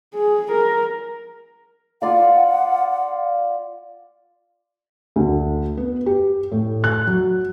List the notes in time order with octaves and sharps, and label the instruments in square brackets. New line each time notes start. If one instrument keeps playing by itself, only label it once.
[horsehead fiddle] G#4
A#4
[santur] F4 D5 F5 [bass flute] F#5
[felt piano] D2
B3
G4
A2
F#6
F#3